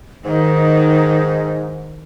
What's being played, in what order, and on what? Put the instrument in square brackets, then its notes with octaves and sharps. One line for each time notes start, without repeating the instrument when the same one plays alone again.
[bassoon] G#2 [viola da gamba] D#3 [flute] D#4